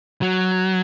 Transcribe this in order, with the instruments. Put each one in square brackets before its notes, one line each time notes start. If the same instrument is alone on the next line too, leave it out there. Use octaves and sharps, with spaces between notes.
[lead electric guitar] F#3